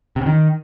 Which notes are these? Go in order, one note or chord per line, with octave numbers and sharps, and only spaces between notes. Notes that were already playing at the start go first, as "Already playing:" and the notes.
C3
C#3
D#3